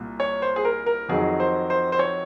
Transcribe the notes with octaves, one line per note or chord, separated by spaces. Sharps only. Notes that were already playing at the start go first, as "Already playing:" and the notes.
Already playing: C2 A#2
C#5
C5
G#4
A#4
A#4
F2 D#3 F#3 G#4
C5
C5
C5
C#5